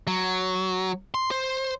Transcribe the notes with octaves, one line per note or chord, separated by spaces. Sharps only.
F#3
C6
C5